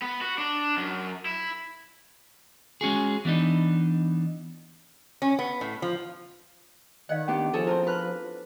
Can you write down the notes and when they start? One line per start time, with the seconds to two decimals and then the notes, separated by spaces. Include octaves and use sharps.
0.02 B3
0.21 F#4
0.38 D4
0.77 F#2
1.25 E4
2.81 G#3 C#4 F#4 G#4
3.25 E3 B3 D4 D#4
5.22 C#4
5.39 B3
5.61 A2
5.82 F3
7.09 D#3 D5 D#5 F5 F#5
7.28 B3 C#4 D4 G4
7.53 F3 G#4 A4 C#5
7.67 C4 E4 A#4 C5 A5
7.87 B4 F6 F#6